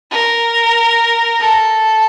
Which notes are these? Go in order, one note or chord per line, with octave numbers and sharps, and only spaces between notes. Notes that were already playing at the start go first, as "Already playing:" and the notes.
A#4
A4